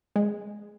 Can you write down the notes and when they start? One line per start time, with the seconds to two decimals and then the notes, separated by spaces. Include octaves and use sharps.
0.16 G#3